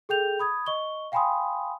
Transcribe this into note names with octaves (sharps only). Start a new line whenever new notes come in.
G#4 A4 G5 G6 F7
B5 D#6 G#6
D#5 C#6 G7
F5 G5 G#5 B5 C6 D#6